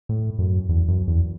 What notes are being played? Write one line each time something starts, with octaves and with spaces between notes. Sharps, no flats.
A2
F#2
E2
F#2
E2